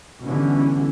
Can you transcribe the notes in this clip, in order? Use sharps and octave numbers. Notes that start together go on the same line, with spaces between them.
B2 D3 E3 G3 C#4